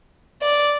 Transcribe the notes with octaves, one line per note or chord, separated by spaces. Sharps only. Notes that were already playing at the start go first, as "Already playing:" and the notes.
D5